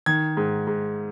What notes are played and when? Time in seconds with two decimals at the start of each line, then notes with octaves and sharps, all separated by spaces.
0.06 D#3 G#6
0.37 G#2
0.67 G#2